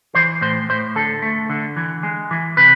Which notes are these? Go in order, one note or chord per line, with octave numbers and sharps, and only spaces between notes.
E3 C5
A2 C5
A2 C5
D3 A4
A3
D3
E3
G#3
E3
C3 B4